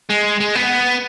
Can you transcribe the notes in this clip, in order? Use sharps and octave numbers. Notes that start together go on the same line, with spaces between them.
G#3
G#3
B3